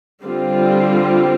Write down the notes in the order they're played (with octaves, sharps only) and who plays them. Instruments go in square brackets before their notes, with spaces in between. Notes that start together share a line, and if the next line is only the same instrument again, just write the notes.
[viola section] D3 G3 C4 F4